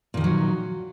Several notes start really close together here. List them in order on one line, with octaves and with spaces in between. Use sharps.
A#2 D#3 D3 F#3